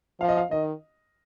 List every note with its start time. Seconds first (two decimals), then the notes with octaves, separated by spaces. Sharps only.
0.21 F3 F5
0.28 D#5
0.37 F5
0.51 D#3 D#5